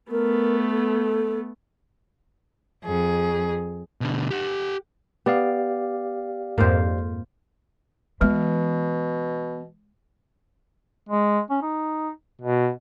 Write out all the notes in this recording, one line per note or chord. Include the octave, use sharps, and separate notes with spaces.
A3 B3 A#4
A4
F2 G#4
B2 D3
G4 F#5
B3 G4 D5 F5
F2 G#2 A#3 F4 C5
B2 E3 G#3 B3
G#3
C#4
D#4
B2